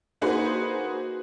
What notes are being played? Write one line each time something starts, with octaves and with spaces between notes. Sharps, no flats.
A#3 D#4 F#4 G#4 B4 C5